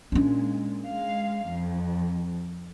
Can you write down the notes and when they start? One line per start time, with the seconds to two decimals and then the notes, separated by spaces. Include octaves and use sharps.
0.12 A#2 G#3 C#4 D4
0.86 G#3 F5
1.48 F2